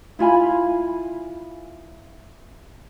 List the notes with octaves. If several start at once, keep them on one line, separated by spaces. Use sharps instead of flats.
E4 F4 G#5 B5